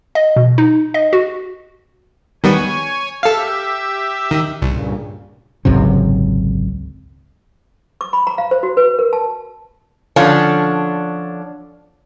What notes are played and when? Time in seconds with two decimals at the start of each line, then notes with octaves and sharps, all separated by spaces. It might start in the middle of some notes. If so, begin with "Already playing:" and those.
0.15 D#5
0.36 B2
0.58 D#4
0.94 D#5
1.13 F#4
2.44 D#3 G3 B3 C#5 G#5
3.23 G4 A4 E5 F5
4.31 D#3
4.62 C2 G2 A#2 C#3
5.65 G#1 C#2 F#2 C3
8.01 D6
8.13 B5
8.27 A#5
8.38 F5
8.51 C5
8.63 F#4
8.77 B4
8.99 A#4
9.13 A5
10.16 D3 F3 C#4 D4